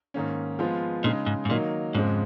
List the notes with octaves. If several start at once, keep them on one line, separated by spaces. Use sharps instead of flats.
G#2 D#3 A#3 C#4
F3 G#3 B3 F4
A#2 C#3 G#3 D#4
G#2
G#2
A#2 D#3 F#3 A#3 D#4
F2 G#2 C#3 G#3